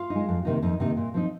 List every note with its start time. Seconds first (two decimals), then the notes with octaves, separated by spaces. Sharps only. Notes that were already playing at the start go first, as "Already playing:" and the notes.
Already playing: F4 F5
0.10 D#4
0.15 G#3
0.29 F2
0.45 C3 D#3 A#3 D#4
0.62 F2 D#4
0.80 C3 D#3 A#3 D#4
0.97 A#2
1.14 F3 C4 D#4